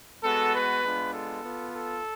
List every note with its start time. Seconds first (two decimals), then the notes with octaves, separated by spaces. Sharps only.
0.24 G#3 B3 F#4 A4
0.54 B4
0.84 G#3 B3 D4 F4
1.14 A4
1.44 B3 F4
1.74 A4